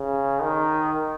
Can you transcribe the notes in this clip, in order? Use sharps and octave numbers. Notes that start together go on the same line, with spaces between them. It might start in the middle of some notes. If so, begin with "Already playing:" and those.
Already playing: C#3
D#3